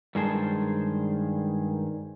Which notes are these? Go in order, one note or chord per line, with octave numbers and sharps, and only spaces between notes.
G2 D#3 G#3 G#4 C5 A5